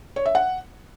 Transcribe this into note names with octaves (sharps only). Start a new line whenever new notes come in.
C#5
E5
F#5